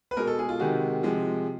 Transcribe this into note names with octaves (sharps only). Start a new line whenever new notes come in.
B4
B2 G#3 A#4
A4
G#4
F4
C3 D#3 G#3 F#4
C3 F3 G#3